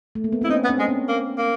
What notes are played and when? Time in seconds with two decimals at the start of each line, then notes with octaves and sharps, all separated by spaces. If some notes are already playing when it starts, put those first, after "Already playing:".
0.15 A3
0.24 A#3
0.32 B3
0.41 C4 E4
0.50 B3 C#4 D#4
0.64 B3
0.69 C4 D4
0.79 G#3
0.89 B3 C#4
1.08 A#3
1.38 A#3